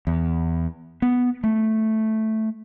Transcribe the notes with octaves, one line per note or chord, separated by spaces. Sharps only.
E2
B3
A3